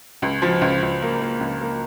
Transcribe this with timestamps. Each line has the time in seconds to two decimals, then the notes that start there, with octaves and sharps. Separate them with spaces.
0.22 C#2
0.42 F3
0.61 C#2
0.82 C#2
1.02 A#3
1.21 A#3
1.40 C#2
1.61 A#3